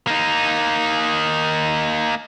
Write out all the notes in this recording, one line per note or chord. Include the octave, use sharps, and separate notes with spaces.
A#3 D#4